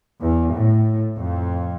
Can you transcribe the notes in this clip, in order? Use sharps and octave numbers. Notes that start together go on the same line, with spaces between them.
E2
A2
F2